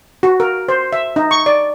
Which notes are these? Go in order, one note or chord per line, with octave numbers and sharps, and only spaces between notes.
F#4
A#4
C5
E5
D#4
C#6
D5